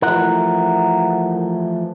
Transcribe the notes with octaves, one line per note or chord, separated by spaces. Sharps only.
E3 F3 A3 A#4 F#5